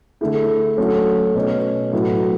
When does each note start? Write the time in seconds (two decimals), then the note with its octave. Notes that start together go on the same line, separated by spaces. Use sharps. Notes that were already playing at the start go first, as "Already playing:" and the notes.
0.21 D3 A3 E4 G#4
0.77 F#3 A3 C#4
1.35 B2 A3 C#4 F#4
1.93 A2 F#3 B3 F#4